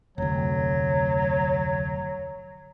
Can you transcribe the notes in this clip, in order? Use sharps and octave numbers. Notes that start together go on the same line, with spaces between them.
F1 D2 F#3